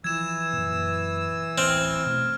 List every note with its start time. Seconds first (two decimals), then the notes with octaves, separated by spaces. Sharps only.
0.04 E3 F3 E6 G#6 E7
0.53 F#2 A#2
1.58 D1 A1 C4 F6
2.06 B2 A3